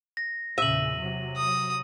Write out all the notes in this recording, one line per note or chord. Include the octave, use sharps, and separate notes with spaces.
A#6
E2 A#2 C#3 E5 D#7 F#7
C3 F#3
D#6